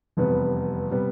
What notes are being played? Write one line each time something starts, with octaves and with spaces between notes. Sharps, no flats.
F1 E2 C3 G3 B3
C3 G3 B3